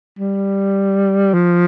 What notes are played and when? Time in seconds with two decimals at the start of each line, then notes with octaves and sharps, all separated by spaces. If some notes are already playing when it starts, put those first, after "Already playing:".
0.19 G3
1.34 F3